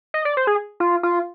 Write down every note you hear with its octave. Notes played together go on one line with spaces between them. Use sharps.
D#5
D5
C5
G#4
F4
F4